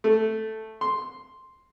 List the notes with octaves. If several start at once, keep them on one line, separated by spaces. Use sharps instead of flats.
A3
C6